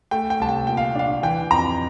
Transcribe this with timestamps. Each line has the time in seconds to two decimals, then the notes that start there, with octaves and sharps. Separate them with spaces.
0.11 A3 G5
0.30 G5
0.40 C2 A5
0.49 G5
0.67 A#2 G5
0.77 F5
0.95 D4 F5
1.23 E3 G5
1.51 F2 A#5